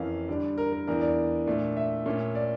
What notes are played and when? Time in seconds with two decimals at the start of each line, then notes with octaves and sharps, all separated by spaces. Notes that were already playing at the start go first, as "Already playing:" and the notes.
Already playing: F2 E3 A#3 C#4 F5
0.28 D3 G3 D4
0.58 A#4
0.73 A#4
0.87 E2 E3 A#3 D4 A#4
1.01 D5
1.46 A#2 A3 D4
1.77 E5
2.06 A#2 A3 C#4
2.35 D5